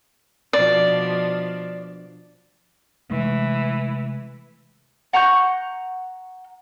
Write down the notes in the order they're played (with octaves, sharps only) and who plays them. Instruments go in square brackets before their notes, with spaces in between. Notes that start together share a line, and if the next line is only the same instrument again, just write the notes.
[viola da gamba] B2 F3 D4 [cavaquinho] D5
[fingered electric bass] C3 G#3 A3 [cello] E3
[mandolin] F#5 A#5 C#6 G6